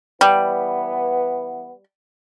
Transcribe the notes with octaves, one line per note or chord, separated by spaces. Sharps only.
E3 G3 B3